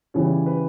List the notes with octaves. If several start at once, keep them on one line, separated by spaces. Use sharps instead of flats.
C#3 E3 G3 C#5
B4